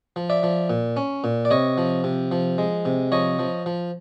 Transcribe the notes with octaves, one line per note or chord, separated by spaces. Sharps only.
F3
D5 E5
F3
A#2
C#4
A#2
D5
C3 C#5 D#5
F3
C3
F3
G#3
C3
F3 C#5 D#5
F3
F3